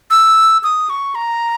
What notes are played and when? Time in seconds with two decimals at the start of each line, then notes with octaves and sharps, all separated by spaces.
0.10 E6
0.64 D#6
0.90 C#6
1.15 A#5